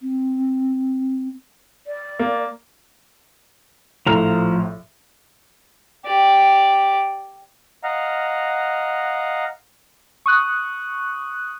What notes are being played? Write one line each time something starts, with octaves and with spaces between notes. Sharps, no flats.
C4
D5
A#3
A#1 A2 F3 A#5 F6
G4 D5
D#5 F5 F#5 A#5
C#6 D#6 F#6